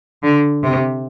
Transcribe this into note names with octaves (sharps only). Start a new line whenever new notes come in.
D3
C3